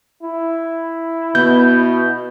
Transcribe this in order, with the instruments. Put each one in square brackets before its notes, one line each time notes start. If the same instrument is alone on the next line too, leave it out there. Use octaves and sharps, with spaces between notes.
[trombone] E4
[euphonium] B2 [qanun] B3 [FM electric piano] G6